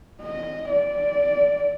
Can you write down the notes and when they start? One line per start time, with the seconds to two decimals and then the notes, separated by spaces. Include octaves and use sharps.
0.23 D#5
0.70 D5